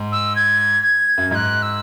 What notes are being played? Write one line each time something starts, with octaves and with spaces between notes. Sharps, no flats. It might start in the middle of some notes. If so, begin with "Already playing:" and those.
Already playing: G#2
E6
G#6
G#6
F#2
G#2 F#6 G#6
E6